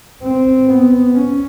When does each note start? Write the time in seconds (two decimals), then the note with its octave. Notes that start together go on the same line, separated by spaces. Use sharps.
0.22 C4
0.67 B3
1.14 C#4